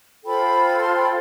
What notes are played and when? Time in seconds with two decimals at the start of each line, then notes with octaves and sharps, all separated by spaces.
0.24 F4 A4 C5 G5 B5
0.80 A5 C6
0.94 G5 B5